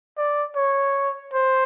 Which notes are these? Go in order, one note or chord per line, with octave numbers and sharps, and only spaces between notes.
D5
C#5
C5